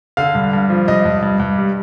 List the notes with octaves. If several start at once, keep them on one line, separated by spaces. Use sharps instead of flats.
D3 F5
G2
G2
F3
G2 D#5
G2
G2
G2
G3